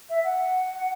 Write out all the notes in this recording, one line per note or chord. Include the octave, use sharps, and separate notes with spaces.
E5
F#5